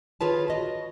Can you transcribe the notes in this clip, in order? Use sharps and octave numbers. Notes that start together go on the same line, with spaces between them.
D#3 F4 G#4 B4 C#5 A5
F#4 D#5